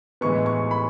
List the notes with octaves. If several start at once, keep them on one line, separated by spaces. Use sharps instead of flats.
A2 E3 G#3 B3 C#6
C#6
B5